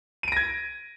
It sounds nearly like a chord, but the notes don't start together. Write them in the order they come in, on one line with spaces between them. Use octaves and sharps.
D#7 D7 A#6 G#6